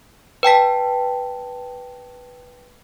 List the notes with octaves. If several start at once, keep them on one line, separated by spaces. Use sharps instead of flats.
B4 G5 A5 B6